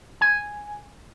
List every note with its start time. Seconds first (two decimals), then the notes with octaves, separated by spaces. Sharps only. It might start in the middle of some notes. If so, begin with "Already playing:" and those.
0.21 G#5